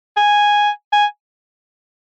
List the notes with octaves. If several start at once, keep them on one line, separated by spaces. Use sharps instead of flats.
G#5
G#5